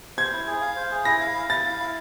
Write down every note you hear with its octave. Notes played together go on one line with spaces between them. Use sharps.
C5 G#6
E4
G#4
F5
C5
G#4
E4 A#6
F5
E4
E4 A6
F5
E4